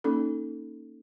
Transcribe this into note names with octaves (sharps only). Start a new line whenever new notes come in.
A#3 C#4 D#4 A4